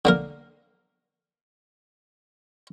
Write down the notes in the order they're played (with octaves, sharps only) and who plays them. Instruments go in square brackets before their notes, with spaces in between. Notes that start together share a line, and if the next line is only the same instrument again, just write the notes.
[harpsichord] D3 A#3 A#4